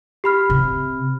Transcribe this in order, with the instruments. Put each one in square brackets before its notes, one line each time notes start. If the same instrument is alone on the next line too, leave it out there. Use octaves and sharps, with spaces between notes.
[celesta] G4 B5 F6
[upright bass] C3